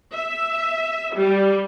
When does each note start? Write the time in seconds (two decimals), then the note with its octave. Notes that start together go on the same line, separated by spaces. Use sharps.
0.15 E5
1.15 G3